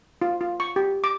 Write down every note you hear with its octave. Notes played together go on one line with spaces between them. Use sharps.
F4
F4
C#6
G4
D6